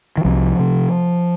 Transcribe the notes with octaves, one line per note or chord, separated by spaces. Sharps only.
D#3
C2 F3
C3